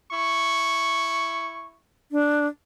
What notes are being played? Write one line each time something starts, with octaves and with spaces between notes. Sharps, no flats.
E4 C#6
D4